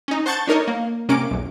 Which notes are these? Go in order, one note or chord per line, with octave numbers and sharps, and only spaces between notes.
C#4 D#4
C5 F#5 A5 C#6 G6 A6
D4 D#4 A#4 C#5 D#5
A#3
C3 A#3 C#4 D6 D7
B1 E2